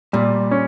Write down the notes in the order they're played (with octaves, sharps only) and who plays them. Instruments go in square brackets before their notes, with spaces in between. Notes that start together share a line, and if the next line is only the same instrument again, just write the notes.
[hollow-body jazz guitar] A#2 [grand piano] G3
[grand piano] C#4